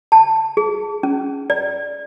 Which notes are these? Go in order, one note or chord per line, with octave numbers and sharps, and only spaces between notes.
A5
G#4
C#4
D5